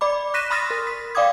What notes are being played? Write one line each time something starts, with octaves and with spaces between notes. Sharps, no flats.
D5 B5 D6
C#6 F#6 A#6 B6 D#7 E7
B5 C6 D#6 F6 A6 A#6
A#4
B6
D5 F5 G5 D6 D#6 G#6